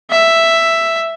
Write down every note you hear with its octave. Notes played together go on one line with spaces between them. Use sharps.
E5